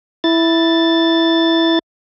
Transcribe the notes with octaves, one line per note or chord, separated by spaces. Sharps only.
E4 A6